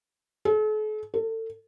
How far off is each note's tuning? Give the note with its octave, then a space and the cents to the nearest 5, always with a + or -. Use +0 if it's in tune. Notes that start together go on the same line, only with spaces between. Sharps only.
A4 -45
A4 +30